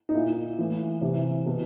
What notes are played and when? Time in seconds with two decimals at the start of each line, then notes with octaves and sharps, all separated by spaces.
0.09 D#4
0.14 A#2 E4
0.59 A2 E3
1.01 C3 E3
1.46 B2